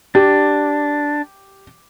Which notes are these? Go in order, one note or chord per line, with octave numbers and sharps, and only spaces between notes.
D4 G4